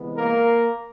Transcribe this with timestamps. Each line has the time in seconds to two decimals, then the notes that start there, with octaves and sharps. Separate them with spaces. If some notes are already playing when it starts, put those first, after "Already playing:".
Already playing: C3 E3 G#3 B3
0.16 A#3 A#4